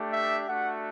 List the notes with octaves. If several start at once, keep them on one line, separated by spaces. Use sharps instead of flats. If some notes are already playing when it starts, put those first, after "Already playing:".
Already playing: A3 D4 G4
E5
A3 D4 F#4 F#5